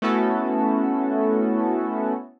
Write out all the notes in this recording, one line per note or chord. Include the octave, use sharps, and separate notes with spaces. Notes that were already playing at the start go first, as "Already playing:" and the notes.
A3 B3 C#4 E4 F#4 A4